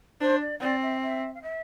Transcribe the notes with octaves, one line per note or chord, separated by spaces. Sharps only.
D4 C5
D5
C4 D5
E5
E5
F5
E5